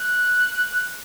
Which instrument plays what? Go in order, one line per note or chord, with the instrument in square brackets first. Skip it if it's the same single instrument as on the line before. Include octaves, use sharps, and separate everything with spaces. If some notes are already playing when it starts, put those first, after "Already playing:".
Already playing: [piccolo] F#6